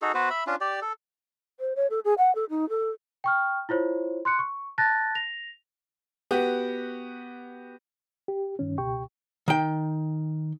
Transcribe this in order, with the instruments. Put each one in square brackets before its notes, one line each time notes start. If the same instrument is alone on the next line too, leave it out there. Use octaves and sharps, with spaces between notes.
[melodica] D#4 F#4 G#4 A4
B3 F#4 B4 C5
E5 B5
C#4 D4 F4
G4 D5
A4
[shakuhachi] C5
C#5
A4
G#4
F#5
A4
D#4
A4
[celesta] G5 C#6 F6
E4 F4 C5 C#5
C6 F#6 C#7
C#6
A5 F#6 A6 A#6
A#6 F7
[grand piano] B3 F#4 G4
[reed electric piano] G4
G2 D#3 C#4
C#2 B2 G4 G5 C#6
[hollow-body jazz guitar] D#3 G5